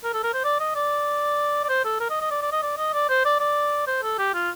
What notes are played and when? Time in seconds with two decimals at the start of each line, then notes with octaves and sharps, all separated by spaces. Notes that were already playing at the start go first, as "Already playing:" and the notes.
0.04 A#4
0.13 A4
0.23 A#4
0.34 C5
0.44 D5
0.60 D#5
0.75 D5
1.64 D5
1.69 C5
1.85 A4
2.00 A#4
2.10 D#5
2.21 D#5
2.31 D5
2.42 D5
2.52 D#5
2.63 D5
2.78 D#5
2.94 D5
3.09 C5
3.25 D5
3.40 D5
3.87 C5
4.03 A4
4.18 G4
4.34 F4